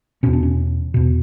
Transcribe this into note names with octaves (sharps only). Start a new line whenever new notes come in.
E2 B2 C#4
D4
C#4
E2 B2